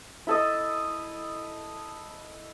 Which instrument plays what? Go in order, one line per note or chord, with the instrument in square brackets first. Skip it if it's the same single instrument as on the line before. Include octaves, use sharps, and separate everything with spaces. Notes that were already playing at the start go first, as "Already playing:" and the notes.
[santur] E4 A4 D#5